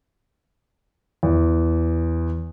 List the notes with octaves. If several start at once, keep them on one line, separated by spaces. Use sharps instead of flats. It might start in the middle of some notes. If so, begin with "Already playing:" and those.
E2